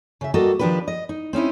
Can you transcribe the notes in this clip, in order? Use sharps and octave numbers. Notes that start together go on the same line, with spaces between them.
C#3 E5
G3 A#3 F#4 A4 D#5
D#3 F3 D4 G4 B4
D#5
D#4
C4 C#4 D#4 E4